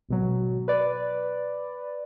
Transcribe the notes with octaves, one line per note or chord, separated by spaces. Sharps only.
G#1 B2 F#3
B4 D5